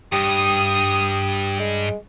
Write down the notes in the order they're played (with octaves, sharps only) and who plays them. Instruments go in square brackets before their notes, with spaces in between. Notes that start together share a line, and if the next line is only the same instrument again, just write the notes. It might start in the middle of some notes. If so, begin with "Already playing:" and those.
[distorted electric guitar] G2 [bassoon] G4 [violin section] D#6
[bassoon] G#3